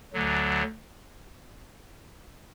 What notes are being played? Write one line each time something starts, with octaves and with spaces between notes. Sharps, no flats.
D2 D3 F#3